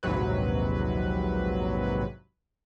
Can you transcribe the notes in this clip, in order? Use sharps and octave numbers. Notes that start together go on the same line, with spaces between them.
A#1 D#2 G#2 C3 F#3 B4